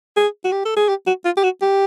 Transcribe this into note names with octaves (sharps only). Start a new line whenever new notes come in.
G#4
F#4
G4
A4
G#4
G4
F#4
F4
G4
F#4
G4